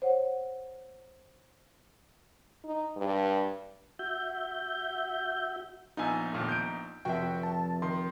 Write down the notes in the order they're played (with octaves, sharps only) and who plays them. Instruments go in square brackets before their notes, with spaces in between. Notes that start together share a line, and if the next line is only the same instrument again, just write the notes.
[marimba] C5 C#5 F#5
[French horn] D#4
G2
[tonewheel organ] F#4 E5 G6
[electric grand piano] A#1 B3 D#4 [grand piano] F4 G#5 E6
[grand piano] D#2 A#2 A3
G6 D7
[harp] F1 C4 E5 [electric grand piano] F#4 G5
[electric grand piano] A5
[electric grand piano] D#3 [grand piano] C6